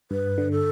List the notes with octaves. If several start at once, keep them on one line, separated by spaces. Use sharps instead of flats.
G2 B4
D3
A4